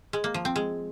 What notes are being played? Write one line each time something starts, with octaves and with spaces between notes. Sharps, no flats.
G#3
A#3
F3
C4
G#3